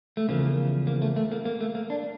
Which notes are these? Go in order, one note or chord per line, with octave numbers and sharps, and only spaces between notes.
A3
E2 C#3 F3 A#3
A#3
A3
A3
A#3
A#3
A3
A#3
D4